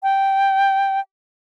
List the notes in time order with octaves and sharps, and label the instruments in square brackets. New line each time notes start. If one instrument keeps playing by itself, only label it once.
[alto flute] G5